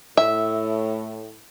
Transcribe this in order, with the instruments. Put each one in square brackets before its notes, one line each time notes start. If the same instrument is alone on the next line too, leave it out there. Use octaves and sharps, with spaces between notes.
[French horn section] A2 [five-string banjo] E5